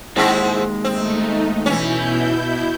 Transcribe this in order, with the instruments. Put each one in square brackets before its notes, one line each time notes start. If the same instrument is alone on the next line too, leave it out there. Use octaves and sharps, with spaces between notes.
[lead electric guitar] D#2 G#3 [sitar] G#2 C4 E4
[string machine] A3 D#4 [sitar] C4
[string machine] B2 E4 G6 [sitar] E3 C#4